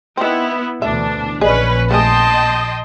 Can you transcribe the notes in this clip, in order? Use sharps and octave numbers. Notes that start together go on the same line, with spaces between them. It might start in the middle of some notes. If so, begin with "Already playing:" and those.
D#3 B3 C4 E4
D2 B2 E3 D4 E5
A#1 A#2 C#4 D4 G#4 B4 D#5
A3 C4 G#4 D#5 G5 A5 C6